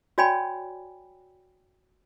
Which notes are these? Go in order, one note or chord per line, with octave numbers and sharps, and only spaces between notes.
F#4 C#5 D5 G5 G#5 B5